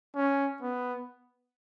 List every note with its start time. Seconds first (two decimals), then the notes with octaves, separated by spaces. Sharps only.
0.15 C#4
0.62 B3